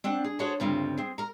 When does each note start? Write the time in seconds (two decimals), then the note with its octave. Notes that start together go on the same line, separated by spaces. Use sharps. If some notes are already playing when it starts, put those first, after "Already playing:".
0.04 C4 D4 F#5
0.24 G#4
0.39 F#4 G#4 A4 C5 C#5 F#5
0.60 D2 G2 C#3 C4 F4
0.97 C4 G#4
1.18 A#4 A#5